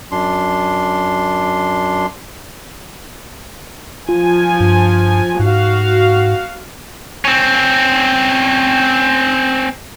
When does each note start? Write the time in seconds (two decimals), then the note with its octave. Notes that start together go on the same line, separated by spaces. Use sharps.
0.12 F#2 D4 C6
4.09 F3 F4 G#5
4.60 G2
5.39 G#2 F#4 F5
7.25 C4 C#4